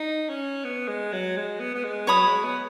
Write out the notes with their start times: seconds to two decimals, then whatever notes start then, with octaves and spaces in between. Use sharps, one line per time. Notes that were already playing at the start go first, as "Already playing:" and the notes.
Already playing: D#4
0.29 C#4
0.64 B3
0.88 G#3
1.13 F#3
1.37 G#3
1.60 B3
1.75 B3
1.85 G#3
2.07 F#3 C#5 B5 D#6
2.26 G#3
2.44 B3